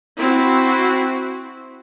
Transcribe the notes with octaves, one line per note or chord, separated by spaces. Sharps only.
C4 E4 F#4